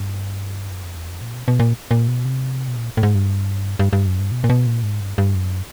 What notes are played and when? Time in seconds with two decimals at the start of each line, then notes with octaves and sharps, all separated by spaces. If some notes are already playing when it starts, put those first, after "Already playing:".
Already playing: G2
0.69 F#2
0.83 F2
0.96 E2
1.09 F2
1.21 A#2
1.34 B2
1.48 B2
1.60 A#2
1.91 A#2
2.08 B2
2.25 C3
2.68 B2
2.76 A#2
2.97 A2
3.03 G#2
3.15 G2
3.79 G2
3.93 G2
4.06 F#2
4.19 G2
4.32 B2
4.44 A#2
4.50 B2
4.67 A#2
4.83 G#2
5.01 G2
5.18 G2
5.35 F#2